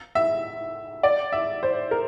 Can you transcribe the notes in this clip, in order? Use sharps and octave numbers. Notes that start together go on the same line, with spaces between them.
E5
D5
E5
C5
A#4